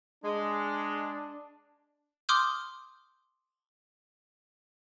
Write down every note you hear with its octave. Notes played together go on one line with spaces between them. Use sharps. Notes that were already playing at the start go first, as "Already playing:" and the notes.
G#3 D4
C6 D6 D#6 F6 G6